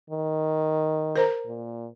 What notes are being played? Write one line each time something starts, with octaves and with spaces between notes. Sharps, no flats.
D#3
A#4 C5 A#5
A#2